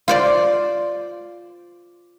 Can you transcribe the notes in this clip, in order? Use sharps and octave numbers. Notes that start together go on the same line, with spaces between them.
F4 C5 D5